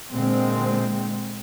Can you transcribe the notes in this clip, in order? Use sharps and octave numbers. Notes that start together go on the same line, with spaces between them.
A#2 D3 G#3 C4